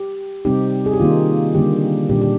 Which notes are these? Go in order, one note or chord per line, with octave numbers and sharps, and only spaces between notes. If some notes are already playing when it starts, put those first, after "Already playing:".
Already playing: G4
C3 G3 C4 D#4 G4
G#4
G4
D#3 A#3 D#4 F4
D3 G3 A#3 G4
A#2 G3 D4 G4
G4